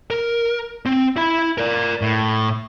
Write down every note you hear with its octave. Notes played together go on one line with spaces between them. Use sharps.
A#4
C4
E4 B5
A#4 D5
A2